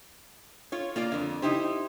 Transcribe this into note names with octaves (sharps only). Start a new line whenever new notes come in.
F4 C#5
A#3 F4 D5
F2 D3
D#4 E4 G4 C5